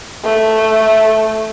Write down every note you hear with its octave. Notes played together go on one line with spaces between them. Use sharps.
A3